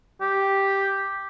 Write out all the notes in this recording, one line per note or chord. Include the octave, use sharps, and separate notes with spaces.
G4